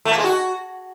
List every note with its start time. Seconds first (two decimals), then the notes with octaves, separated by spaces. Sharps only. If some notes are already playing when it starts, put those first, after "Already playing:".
0.05 A3
0.12 A#3
0.18 G#3
0.24 F#4